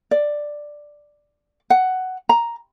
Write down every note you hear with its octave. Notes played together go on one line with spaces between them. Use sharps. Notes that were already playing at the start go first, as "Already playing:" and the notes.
D5
F#5
A#5